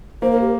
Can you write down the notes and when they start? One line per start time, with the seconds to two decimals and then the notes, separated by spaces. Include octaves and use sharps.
0.22 A#3 C5
0.31 A#4
0.41 G4